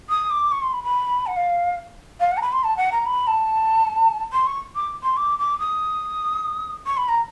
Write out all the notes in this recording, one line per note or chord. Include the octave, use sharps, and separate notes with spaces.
D#6
D6
C#6
C6
B5
B5
F#5
F5
F5
F#5
A#5
B5
C6
A5
F#5
A#5
B5
A5
C6
C#6
D6
C6
D6
D6
D#6
C#6
B5
A#5